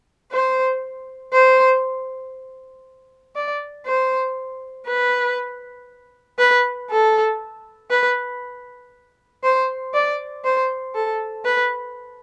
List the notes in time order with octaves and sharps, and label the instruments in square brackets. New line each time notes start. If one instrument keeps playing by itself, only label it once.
[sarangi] C5
C5
D5
C5
B4
B4
A4
B4
C5
D5
C5
A4
B4